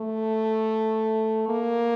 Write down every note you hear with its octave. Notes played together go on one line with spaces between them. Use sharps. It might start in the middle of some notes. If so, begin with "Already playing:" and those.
Already playing: A3
A#3